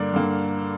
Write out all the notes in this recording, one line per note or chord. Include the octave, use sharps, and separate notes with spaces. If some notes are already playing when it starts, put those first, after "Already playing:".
Already playing: G2 D3 A#3 D4 D5
G2 D3 A#3 D4